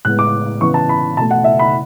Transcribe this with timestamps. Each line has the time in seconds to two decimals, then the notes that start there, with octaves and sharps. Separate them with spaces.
0.05 A2 G#3 B3 F#6
0.19 D6
0.61 C#3 E3 B3 C#6
0.74 A5
0.89 B5
1.17 B2 A3 A5
1.31 F#5
1.44 E5
1.59 B5